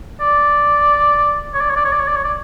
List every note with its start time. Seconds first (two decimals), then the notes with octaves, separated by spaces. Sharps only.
0.21 D5
1.54 C#5
1.61 D5
1.70 C#5
1.76 D5
1.85 C#5
1.92 D5
2.00 C#5
2.08 D5
2.16 C#5
2.24 D5